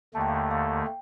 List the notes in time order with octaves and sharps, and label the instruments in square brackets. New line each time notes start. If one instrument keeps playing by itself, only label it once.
[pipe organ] D#2 D3 A3 [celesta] A5
[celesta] G5
F5
G5
F5
G5